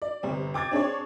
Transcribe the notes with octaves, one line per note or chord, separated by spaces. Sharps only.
D5
G1 C3 C4
G5 D6 G#6 A6
C4 D4 G#4 C#5